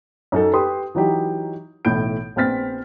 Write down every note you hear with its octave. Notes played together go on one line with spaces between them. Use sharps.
F#2 D#4 A4
G4 B4 C6 D#6
E3 F#3 D#4 G4
B1 A2 E3 E4 G6 D7
A#1 B3 C4 F6 A6 B6